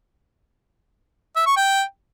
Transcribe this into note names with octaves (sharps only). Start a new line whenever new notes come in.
E5
C#6
G5